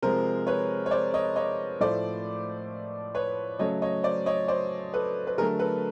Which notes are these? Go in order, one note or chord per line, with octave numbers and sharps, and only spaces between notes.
C3 F3 G#3 A#4 C5
B4 C#5
C#5
C5 D5
C#5 D#5
C#5 D#5
A2 F3 A3 C5 D5
B4 C#5
C#3 F#3 A3 C#5 D#5
C#5 D#5
C5 D5
C#5 D#5
C5 D5
A4 B4
B4
D3 F#3 A3 G#4 A#4
A4 B4